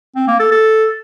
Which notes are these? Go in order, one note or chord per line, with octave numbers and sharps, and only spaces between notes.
C4
A#3
A4
A4